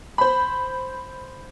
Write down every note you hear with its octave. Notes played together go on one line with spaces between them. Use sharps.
C5 B5